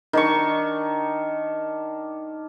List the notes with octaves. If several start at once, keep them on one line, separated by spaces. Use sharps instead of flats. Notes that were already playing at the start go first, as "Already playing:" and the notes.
D#3 D4 C#6